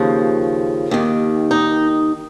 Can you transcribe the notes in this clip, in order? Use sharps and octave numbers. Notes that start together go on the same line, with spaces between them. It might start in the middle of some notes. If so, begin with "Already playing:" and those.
Already playing: D#2 C#3 F3
D#2 D#3
D#4